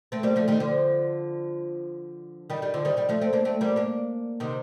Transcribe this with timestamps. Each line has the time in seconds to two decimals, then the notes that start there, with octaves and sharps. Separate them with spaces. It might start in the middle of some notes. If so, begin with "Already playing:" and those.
0.12 A3 C4
0.23 G3 A#3
0.36 F3 A3
0.48 D#3 G3
0.60 D3 F3
2.50 D#3 G3
2.62 D#3 G3
2.74 D3 F3
2.85 D#3 G3
2.97 D#3 G3
3.09 F3 A3
3.21 A3 C4
3.33 A#3 D4
3.45 A3 C4
3.61 G3 A#3
3.76 A#3 D4
4.40 C3 D#3